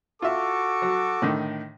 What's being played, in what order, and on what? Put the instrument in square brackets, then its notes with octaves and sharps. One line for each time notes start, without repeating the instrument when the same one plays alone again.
[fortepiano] F4 E5 [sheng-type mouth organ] F#4 [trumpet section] A4 C#6 D6
[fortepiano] F#3
A2 D3 D#3